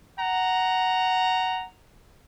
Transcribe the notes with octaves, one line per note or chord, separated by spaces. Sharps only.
F#5 A#5